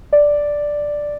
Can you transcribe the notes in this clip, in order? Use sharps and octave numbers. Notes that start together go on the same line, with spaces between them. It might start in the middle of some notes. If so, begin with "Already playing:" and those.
D5